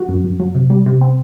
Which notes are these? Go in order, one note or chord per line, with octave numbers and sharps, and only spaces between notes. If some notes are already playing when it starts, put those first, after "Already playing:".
Already playing: F#3 F#4
F#2
F#2
F#3
C3
G3
C3
C4